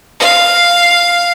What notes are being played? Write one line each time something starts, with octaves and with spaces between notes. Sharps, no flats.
F5